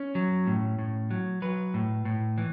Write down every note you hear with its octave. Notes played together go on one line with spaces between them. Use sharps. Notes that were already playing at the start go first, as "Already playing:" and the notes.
Already playing: C#4
F#3
A2
A2
F#3
F#3 B4
A2
A2
E3